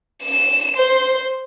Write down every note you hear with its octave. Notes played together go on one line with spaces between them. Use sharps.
E7
C5